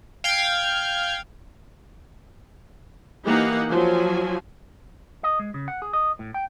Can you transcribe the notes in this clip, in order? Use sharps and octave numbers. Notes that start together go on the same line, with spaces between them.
F5 G5 G#6
E3 A#3 D#4 G4 F#5
F3 F#3 G#5
D#5
G#3
C#3
F#5
G#4
D#5
A2
G5